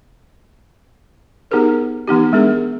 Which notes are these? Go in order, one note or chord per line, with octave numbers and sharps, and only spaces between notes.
B3 D#4 G4 G#4 A#4 C5
E3 B3 D#4 G4
G#3 B3 D4 G#4 A#4